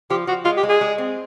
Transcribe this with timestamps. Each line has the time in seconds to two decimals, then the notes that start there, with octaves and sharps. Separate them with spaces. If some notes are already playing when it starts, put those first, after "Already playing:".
0.10 F3 G4
0.27 F3 F#4
0.45 G#3 F4
0.57 G4
0.63 G#3
0.69 G#4
0.81 G#3
0.98 C4